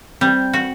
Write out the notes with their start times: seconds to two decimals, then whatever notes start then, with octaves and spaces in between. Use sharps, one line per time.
0.21 G3 C4
0.53 F#4